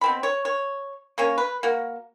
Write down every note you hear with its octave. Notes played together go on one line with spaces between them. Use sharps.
B2 C4 B5
C#5
C#5
A#3 C#4 C#5
B4
A#3 F#4